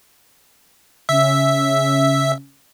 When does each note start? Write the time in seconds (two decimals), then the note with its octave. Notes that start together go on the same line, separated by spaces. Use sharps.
1.09 C#3 C#4 E5